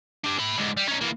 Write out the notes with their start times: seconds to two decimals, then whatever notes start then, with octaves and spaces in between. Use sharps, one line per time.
0.24 D4 G4
0.38 A4 B5
0.57 G#2 D3
0.77 G3
0.88 C#4 D#4
1.01 E3 A#3